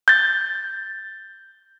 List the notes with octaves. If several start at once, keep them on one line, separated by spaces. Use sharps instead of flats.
G6 A6